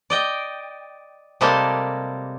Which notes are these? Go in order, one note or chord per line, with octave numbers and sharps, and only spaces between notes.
D5 D#5 G5
C3 G3 G#3 A#3 G4 A4